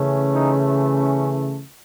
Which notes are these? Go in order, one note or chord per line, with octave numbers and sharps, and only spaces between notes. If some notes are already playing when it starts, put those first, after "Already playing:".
Already playing: C#3 E3 A3 C#4
D#4
C#4